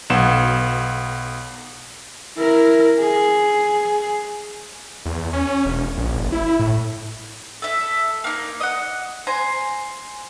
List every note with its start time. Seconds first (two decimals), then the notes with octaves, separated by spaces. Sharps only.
0.10 B1 B3 F#5 E7
2.37 E4 A#4
3.00 G#4
5.05 E2
5.33 C#4
5.65 E1
5.98 A#1
6.17 F#1
6.32 E4
6.59 A2
7.62 A4 E5
8.24 A#3 D#4
8.60 D#5 F#5
9.27 C5 G#5 A#5